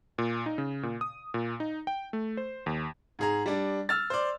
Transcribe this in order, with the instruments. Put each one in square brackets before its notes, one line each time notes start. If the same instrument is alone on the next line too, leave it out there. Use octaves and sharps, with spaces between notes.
[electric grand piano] A#2
D#4
C#3
A#2
D#6
A#2
D#4
G5
A3
C5
D#2
[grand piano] G#2 G#4 A#5
G3 D4
E6 F6 A6
C5 D5